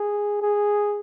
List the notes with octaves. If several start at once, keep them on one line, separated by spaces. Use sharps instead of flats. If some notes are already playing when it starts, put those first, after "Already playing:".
Already playing: G#4
G#4